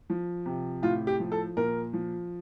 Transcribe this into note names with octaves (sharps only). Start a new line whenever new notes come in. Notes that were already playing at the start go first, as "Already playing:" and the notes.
F3
C3
A2 F4
G4
F3
A4
A#2 A#4
F3